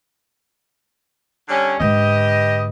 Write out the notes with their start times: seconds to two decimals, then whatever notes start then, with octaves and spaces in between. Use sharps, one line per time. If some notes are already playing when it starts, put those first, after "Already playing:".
1.49 D3 G3 C#4
1.80 G#2 D3 G4 B4 D#5